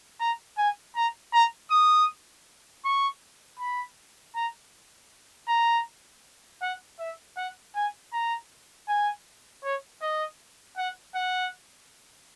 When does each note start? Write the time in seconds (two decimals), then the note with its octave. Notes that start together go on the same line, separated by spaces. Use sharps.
0.20 A#5
0.58 G#5
0.96 A#5
1.33 A#5
1.71 D#6
2.85 C#6
3.59 B5
4.35 A#5
5.48 A#5
6.62 F#5
6.99 E5
7.37 F#5
7.75 G#5
8.13 A#5
8.88 G#5
9.64 C#5
10.01 D#5
10.77 F#5
11.15 F#5